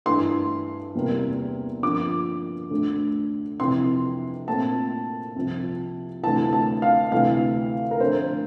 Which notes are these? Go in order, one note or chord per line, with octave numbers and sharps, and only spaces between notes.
G2 E3 A3 C6
E2 C3 G3 A#3
G2 D3 F3 A#3 D6
D2 D3 A3
F2 C3 E3 C6
A#2 A3 C4 A5
C2 C3 F3 C4
D2 C3 E3 A5
A5
F5
D2 C3 E3 A3 F5
A#4
F2 D3 A3 C5